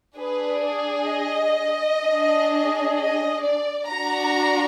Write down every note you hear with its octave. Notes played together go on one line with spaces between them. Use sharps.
D4 G#4 B4
D5
D#5
D4 G#4
D#5
D5
D4 F#4 A#5